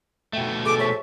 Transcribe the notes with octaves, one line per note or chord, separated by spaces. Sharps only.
B2 A3 E5 G5
G#4 A4 D6
G#4 C5 C#5 E5